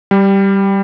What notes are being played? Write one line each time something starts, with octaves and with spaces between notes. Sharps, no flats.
G3